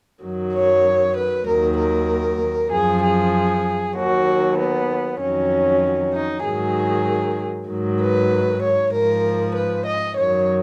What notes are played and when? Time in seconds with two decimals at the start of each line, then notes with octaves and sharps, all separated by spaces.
0.23 F#2 D#3 F#3
0.54 C#5
1.17 B4
1.47 D#2 D#3 F#3 A#4
1.79 A#4
2.72 F#2 F3 G#4
3.03 G#4
3.96 D#2 D#3 F#3 F#4
4.58 B3
5.20 F2 D#3 F#3 C#4
6.13 D#4
6.44 G#2 D#3 F#3 G#4
7.69 G#2 D#3 F#3
8.00 B4
8.62 C#5
8.93 G#2 F3 A#4
9.55 B4
9.86 D#5
10.17 F#2 D#3 F#3 C#5